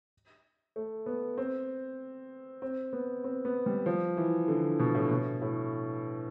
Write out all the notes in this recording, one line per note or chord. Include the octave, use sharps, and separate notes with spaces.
A3
B3
C4
C4
B3
C4
B3
G3
F3
E3
D3
B2
A2
B2
A2